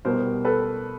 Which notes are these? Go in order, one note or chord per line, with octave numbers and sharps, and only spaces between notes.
C2 B2 G3 B3 A#4 C5
A4 B4